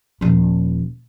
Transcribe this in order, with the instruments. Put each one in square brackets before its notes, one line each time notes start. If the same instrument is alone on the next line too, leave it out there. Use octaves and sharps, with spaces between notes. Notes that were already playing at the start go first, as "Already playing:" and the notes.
[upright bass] D#1 F3